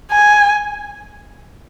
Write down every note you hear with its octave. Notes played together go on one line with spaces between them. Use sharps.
G#5